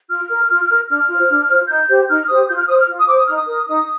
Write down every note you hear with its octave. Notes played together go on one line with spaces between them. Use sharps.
F4 F6
A#4
F4
A#4
D4 F6
F4 C5
D4
F4 C5
D#4 G6
G4 C5
D#4 F6
G4 C5 D#6
F4 G6
F6
C5 D#6
F6
F4
D#6
C5 D6
D#6
D#4 F6
D#6
A#4
D#4 D#6